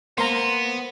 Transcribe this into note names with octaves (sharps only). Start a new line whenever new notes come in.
A#3 B3 C5 A#5 C6